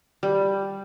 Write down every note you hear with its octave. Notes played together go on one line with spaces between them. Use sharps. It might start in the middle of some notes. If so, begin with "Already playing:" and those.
G3